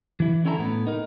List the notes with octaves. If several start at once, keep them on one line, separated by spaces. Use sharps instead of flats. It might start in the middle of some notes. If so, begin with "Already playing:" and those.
E3 E4
D3 C#4 E4 A4 G#5 A#5
A2 B3
D#4 A#4